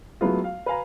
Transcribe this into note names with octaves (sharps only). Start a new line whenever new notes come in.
F#3 G#3 A3 B3 E4 F4
F5
B4 F5 G#5 A#5